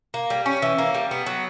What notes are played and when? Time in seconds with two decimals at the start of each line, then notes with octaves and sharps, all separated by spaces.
0.14 A#3
0.30 G3
0.46 C#4
0.62 E3
0.79 A#3
0.95 G3
1.11 B3
1.26 F#3